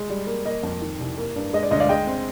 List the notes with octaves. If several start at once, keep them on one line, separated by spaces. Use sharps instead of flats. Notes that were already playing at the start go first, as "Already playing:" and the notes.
Already playing: G#3
G3
A#3
A#3 D#5
F2
D#3
C2
A#3
G2
G#3 D#5
D5
D2 D#5
D5 F5
G#3 D#5 G5
C4